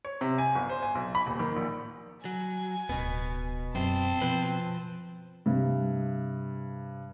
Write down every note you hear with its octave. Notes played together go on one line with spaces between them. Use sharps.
C#5
C3
G#5
G1
C5
G#5
B1
B5
D#1
D#3
A#1
F#3 G#5
D1 B2 B3
F#2 C4 A5
B2 F3 B4
G2 C3